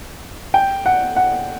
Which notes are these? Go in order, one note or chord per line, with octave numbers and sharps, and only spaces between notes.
G5
F#5
F#5